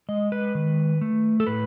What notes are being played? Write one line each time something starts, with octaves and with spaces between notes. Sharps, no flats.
G#3 D#5
B4
D#3
A3
A4
A2 B4